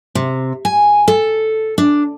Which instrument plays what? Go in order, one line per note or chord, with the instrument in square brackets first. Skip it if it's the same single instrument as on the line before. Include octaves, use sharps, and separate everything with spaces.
[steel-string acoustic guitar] C3
G#5
A4
D4